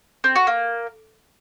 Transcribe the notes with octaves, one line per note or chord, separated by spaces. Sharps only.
C4
F#4
A#3